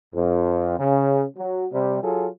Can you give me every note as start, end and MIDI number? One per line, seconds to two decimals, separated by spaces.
0.15 0.76 41
0.79 1.25 49
1.37 1.66 54
1.73 1.99 48
1.73 1.99 55
2.03 2.29 54
2.03 2.29 65
2.03 2.29 68
2.03 2.29 69